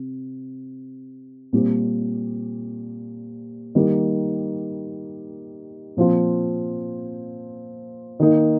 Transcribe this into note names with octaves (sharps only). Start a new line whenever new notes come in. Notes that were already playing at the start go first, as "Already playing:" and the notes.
Already playing: C3
A#2 G3 C4
D#3 G3 A#3
A#2 F3 C4 F4
D#3 A#3 D#4